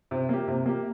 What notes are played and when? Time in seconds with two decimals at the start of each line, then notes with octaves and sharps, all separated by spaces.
0.11 C3
0.29 A#3 G4
0.48 C3
0.66 A#3 G4